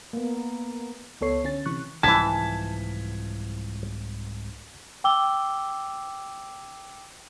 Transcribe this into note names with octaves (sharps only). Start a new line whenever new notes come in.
A#3 B3
C#2 B3 A4 C#5 C7
D3 C#4 A6
C3 E3 C#6 F#6
C2 G#2 E3 F3 G#5 A5 G#6 B6
G5 D6 E6 G7